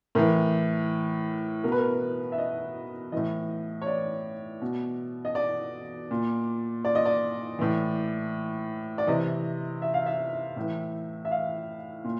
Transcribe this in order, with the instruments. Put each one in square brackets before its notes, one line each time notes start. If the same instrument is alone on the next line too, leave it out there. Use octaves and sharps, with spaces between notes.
[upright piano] A2 E3 A#4
B2 A#4
B4
A#4
E5
D#5
A2 E3 D#5
C#5
D5
B2
D#5
D5
A#2
D5
D#5
D5
A2 E3
D5
C3 E3 D#5
E5
F5
E5
A2 E3
E5
F5
A#2